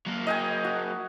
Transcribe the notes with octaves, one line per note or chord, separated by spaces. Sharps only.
F#3 A#3
D#5 G5 G#5
F#4